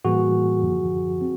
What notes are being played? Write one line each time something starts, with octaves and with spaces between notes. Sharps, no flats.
A2 E3 G3 A#3 F#4 G#4
F#2 D3 F3
C4